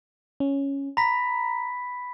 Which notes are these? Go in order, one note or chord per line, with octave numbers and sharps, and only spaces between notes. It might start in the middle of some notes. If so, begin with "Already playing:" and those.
C#4
A#5 B5 B6